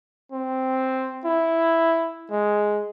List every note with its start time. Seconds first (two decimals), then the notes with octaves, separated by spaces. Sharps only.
0.32 C4
1.25 E4
2.31 G#3